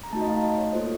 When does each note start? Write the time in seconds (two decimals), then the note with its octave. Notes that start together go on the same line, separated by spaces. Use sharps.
0.03 A#5
0.13 A3 D#4 F#4 A5
0.22 D#5
0.28 F5
0.43 D#5
0.58 C#5
0.73 A#3 F4 A4 C5